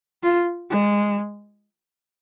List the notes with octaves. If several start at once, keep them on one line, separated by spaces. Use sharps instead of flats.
F4
G#3